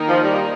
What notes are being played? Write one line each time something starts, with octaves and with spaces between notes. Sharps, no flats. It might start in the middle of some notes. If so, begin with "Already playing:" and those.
Already playing: D#3 A#3 D#4 A#4
F3
G3